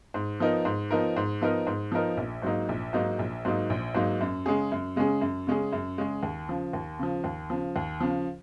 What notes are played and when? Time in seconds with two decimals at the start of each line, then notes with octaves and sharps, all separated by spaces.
0.14 G#2
0.40 F3 B3 D#4 A#4
0.65 G#2
0.91 F3 B3 D#4 A#4
1.17 G#2
1.42 F3 B3 D#4 A#4
1.67 G#2
1.92 F3 B3 D#4 A#4
2.17 A#1
2.42 G#2 F#3 A#3 D#4
2.69 A#1
2.93 G#2 F#3 A#3 D#4
3.19 A#1
3.45 G#2 F#3 A#3 D#4
3.70 A#1
3.95 G#2 F#3 A#3 D#4
4.21 F#2
4.46 C#3 G#3 C#4 G#4
4.72 F#2
4.96 C#3 G#3 C#4 G#4
5.21 F#2
5.47 C#3 G#3 C#4 G#4
5.72 F#2
5.98 C#3 G#3 C#4 G#4
6.23 D#2
6.49 C#3 F3
6.73 D#2
6.99 C#3 F3
7.24 D#2
7.50 C#3 F3
7.76 D#2
8.01 C#3 F3